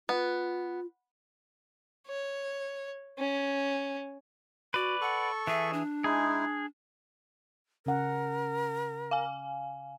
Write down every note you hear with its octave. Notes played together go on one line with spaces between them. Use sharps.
B3 F4
C#5
C#4
F#4 B4 D5
A4 F#5 C#6
E3 G#4 E5
D4
G#3 D#4 E4 G#4
C#3 C#4 A#4 F#5
F5 G#5